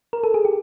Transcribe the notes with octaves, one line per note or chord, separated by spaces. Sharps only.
A#4
A4
G#4
G4